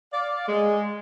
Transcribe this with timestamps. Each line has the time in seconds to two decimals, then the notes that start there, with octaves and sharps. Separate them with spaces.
0.13 D5 F5
0.48 G#3